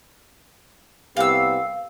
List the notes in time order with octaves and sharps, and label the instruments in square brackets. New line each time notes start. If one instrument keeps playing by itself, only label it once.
[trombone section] C2 B3 G4 [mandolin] F5 E6